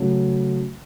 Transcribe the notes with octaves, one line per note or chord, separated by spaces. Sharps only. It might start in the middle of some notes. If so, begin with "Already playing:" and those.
Already playing: C#3 F#3 A3